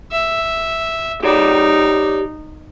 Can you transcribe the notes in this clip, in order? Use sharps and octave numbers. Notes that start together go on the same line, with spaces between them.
E5
D#4 G4 C#5 D5